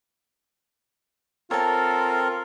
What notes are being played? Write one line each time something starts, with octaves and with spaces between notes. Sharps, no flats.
C4 F4 A4 A#4 C#5 A5